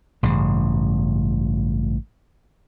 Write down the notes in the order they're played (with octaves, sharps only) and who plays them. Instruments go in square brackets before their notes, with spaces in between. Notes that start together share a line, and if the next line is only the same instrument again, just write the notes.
[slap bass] A1 G2 C#3